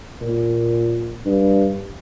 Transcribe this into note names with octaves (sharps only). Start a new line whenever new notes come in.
A#2
G2